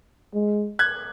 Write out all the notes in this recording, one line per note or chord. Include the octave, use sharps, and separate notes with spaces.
G#3
F#6 G#6